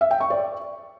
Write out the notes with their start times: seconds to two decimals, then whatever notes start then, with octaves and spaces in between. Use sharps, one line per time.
0.01 E5
0.11 G5
0.21 C#6
0.30 D5